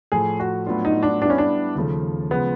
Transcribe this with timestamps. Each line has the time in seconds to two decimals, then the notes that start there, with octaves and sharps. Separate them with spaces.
0.12 A2 F3 A3 G#4
0.40 F#4
0.66 A2 F#3 B3 D4 F4
0.85 D#4
1.03 D4
1.22 G3 B3 D4 E4
1.30 C#4
1.38 D4
1.75 D#2 C#3 F3 A3
2.31 C#3 F3 G#3 B3